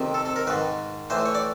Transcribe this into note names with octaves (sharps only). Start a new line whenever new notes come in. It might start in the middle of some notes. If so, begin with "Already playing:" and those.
Already playing: F2 C3 D#3
A4
A4
A#4
G#2 D#3 B4
A2 E3 C5
C#5
D5